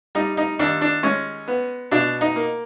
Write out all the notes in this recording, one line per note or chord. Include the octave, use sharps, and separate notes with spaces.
G3 D#4
D#4
D#2 D4
D4
G#3 C#4
B3
B2 D4
D#4
A#3